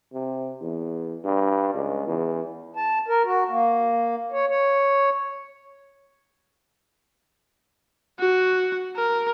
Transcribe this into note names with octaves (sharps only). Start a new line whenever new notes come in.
C3
E2
G2
C#2
E2
A5
A#4
F#4
A#3
C#5
C#5
F#4
A#4